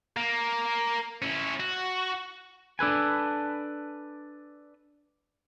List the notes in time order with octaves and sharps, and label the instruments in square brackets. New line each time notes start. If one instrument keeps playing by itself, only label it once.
[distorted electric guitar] A#3
C#4 E4
F#4
[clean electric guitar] D4 A4 B4 G#5